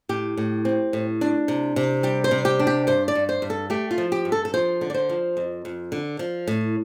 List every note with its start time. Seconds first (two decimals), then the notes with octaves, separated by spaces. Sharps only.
0.09 A2 G4
0.37 A2
0.65 C4
0.93 A2
1.21 D4
1.48 C3
1.76 C3
2.03 G3 G4
2.24 C5
2.31 C3
2.45 G4
2.59 D4
2.67 G4
2.87 G2 C5
3.08 D5
3.15 G2
3.29 C5
3.42 G2
3.50 A4
3.70 A3 G4
3.91 F4
3.98 F3
4.12 G4
4.25 G2
4.32 A4
4.45 A4
4.54 F3 C5
4.81 D3
4.90 D5
4.94 C5
5.09 F3
5.37 F2
5.65 F2
5.92 D3
6.19 F3
6.48 A2